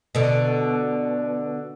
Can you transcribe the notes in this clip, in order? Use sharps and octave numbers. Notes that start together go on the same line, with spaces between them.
B2 D3